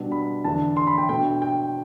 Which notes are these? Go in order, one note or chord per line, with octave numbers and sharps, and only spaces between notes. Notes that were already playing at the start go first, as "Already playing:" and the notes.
Already playing: B2 G3 B3 D4
B5
E2 D3 A3 D4 A5
C6
B5
G5
B2 A3 D4 G5
G5